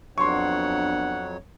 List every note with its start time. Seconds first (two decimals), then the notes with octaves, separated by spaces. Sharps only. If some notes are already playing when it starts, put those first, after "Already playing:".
0.18 F2 F#3 B3 D4 C#5 F#5 C6 C#6